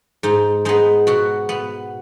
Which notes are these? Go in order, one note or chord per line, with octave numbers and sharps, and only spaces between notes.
G#2 D#4
G#3 B3 D#4
B2 F#4
B3